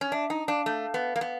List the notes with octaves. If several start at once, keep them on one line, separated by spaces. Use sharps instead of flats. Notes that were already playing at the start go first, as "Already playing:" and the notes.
C#4
D4 E5
D#4 A#5
D4 F5
A3
B3
A#3
B3